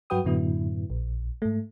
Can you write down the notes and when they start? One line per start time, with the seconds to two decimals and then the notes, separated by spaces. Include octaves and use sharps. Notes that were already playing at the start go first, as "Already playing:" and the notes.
0.10 G2 F#3 F#4 B4 G5 D#6
0.25 F#2 A2 D3 F#3 B3 E4
0.90 A#1
1.42 G#2 A3